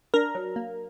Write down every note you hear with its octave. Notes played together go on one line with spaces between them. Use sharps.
D4 A#4 A#5
F#3
A#3